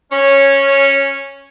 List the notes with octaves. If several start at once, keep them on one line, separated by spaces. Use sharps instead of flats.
C#4